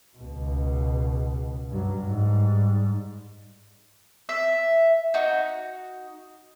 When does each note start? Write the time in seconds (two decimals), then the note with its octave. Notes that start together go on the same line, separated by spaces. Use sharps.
0.18 C#2 B2
1.70 G2 F#3
2.08 G#2 G3
4.29 E5
5.14 D#4 F#4